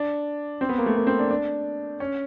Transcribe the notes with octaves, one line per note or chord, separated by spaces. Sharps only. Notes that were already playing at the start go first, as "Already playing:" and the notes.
Already playing: D4
C4
B3
A#3
A3
A#3
C4
D4
D4
C#4